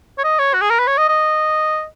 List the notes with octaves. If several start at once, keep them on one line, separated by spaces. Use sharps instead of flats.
C#5
D#5
C#5
F#4
G#4
A#4
B4
C#5
D#5
D#5